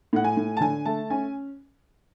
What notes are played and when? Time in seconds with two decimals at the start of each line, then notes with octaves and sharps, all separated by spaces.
0.13 A2 F#5
0.24 G#5
0.37 A2
0.57 A5
0.61 D3 G#5
0.85 A3 A5
1.10 C#4 G#5